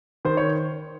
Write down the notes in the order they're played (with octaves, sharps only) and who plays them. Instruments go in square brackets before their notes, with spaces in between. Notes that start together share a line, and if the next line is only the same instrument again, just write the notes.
[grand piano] D#3 C5
C#5